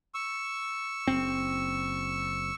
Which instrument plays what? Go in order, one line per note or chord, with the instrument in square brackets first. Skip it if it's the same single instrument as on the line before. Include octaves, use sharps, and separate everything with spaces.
[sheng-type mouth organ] C#6 E6
[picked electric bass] F#1 C4